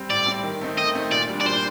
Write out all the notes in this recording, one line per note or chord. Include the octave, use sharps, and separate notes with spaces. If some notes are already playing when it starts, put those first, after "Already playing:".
Already playing: G3 C4
A2 D5
G3 C4
D#3
A3 C4 D#4
D#3 D#5
A3 C4 D#4
A#2 D5
G3 D4
D5
A#2 C5